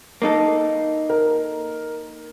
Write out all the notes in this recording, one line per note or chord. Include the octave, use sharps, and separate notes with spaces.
A#3 D#4 A4
A#4